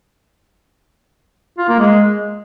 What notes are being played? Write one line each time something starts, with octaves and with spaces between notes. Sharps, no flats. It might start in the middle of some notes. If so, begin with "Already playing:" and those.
F4
A#3
G#3